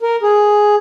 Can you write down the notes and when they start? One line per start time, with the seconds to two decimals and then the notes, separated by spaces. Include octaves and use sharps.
0.01 A#4
0.23 G#4